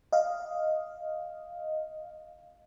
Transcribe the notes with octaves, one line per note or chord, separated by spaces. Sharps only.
D#5 F5